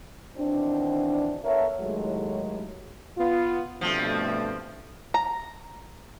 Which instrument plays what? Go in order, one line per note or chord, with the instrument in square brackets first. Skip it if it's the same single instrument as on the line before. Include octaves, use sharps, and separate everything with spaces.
[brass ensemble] B2 D#3 E3 C4 D4
B3 A4 A#4 C#5 D#5 E5
D#2 A2 F#3 G#3
[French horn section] B3 F4
[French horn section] G2 B2 A3 [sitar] F3 C4
[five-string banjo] A#5